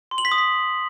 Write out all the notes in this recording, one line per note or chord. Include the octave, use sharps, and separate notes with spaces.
C6
F#7
B6
D#6
B6